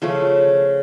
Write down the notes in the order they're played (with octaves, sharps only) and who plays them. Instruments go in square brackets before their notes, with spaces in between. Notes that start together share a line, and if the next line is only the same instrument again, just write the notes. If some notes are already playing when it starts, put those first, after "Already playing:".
[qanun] C#3 F3 A3 C#4